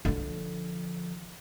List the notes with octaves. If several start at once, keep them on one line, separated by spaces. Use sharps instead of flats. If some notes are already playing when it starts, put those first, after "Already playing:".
D3 F3